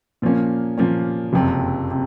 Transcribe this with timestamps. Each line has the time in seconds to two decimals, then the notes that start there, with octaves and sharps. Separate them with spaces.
0.22 A#2 F3 A#3 C#4
0.78 A#2 F3 A#3 C#4
1.33 F#1 F2 C3
1.91 C3